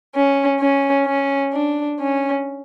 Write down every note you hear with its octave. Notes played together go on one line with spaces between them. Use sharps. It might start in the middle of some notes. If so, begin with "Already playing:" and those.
C#4
C#4
C#4
D4
C#4